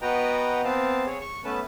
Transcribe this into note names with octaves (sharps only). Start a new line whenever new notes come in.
B3 F#4 B4 D#5 G5 A#5
B3 C4 F5 A5
G#4 C#5
C#6
A3 B3 C#4 B4 A5